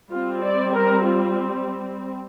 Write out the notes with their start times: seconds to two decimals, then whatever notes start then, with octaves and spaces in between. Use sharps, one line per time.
0.11 G3 C4 F4
0.43 D5
0.74 A#4
1.05 F4